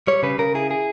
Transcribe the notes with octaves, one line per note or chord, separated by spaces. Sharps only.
G3 C#5
C#3 B4
C#3 A#4
E4 G#4
G#4